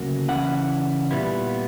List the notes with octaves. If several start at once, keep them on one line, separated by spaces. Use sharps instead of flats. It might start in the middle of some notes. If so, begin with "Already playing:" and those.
Already playing: D2 C#3 F#3 A#3
C#3 E3 A3 C#4 E4 F#5
A#2 G3 B3 E4